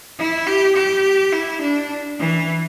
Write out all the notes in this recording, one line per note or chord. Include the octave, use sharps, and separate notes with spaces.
E4
G4
G4
E4
D4
E3